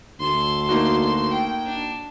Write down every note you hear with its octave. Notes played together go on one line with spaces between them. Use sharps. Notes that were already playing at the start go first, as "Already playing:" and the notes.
D2 A4 C6
A#3 D#4 F#4
G5
D4